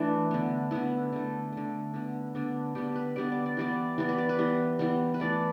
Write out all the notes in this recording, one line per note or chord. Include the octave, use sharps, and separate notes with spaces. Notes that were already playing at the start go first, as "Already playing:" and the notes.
Already playing: E3 A3 D4 E4
D3 B3
D3 B3 E4
D3 A3
D3 A3
D3 B3
D3 B3 D4
D3 G3 B3 G4
B4
D3 G3 B3 D5
D5
D5
E3 G3 B3 D5
E3 G3 B3 D5
B4
D5
B4
E3 G3 B3
E3 G3 B3
B4
E3 A3 D5